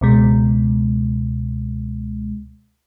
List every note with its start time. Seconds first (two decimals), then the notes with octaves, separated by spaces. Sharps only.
0.01 C#2 B2 G#3